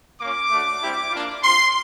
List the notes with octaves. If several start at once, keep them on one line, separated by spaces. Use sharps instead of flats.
A#3 C#4 F4 D6
A3 D4 F#4
G3 C4 E4 G4
A#3 D4 F4
C4 F4 C6